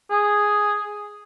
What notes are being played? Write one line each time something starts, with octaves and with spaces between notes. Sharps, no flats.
G#4